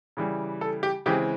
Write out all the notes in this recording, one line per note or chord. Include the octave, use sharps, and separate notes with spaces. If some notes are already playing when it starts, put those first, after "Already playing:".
C#3 E3 G3
A4
G4
C#3 E3 G#3 C4 G4